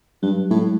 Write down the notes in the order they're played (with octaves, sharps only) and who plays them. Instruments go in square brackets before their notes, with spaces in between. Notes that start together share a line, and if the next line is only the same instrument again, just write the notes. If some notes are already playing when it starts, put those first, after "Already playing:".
[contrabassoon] G2 [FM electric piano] F#3
[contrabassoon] A2 [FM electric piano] G#3